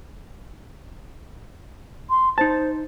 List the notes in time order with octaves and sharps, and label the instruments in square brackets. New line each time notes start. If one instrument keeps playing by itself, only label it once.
[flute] C6
[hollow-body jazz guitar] D#4 A5 [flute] C5